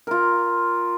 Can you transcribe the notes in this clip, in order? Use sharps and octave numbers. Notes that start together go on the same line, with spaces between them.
F4 A#4